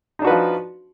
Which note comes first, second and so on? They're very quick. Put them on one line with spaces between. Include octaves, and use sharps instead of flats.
D#4 D4 F#4 B4 F3